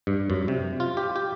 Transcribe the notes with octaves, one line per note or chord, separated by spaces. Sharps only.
G2
F#2
C3
F4
G4
G4